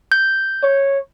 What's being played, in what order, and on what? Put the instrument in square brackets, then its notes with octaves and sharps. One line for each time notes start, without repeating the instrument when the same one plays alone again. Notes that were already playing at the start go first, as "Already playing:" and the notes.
[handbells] G6
[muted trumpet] C#5